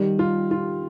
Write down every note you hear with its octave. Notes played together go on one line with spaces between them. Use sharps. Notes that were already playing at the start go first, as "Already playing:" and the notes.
Already playing: D#3 G3
F4
F4